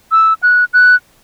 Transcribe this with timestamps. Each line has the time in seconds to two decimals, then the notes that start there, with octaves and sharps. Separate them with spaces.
0.12 E6
0.43 F#6
0.74 F#6